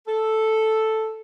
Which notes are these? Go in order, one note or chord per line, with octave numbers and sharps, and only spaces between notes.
A4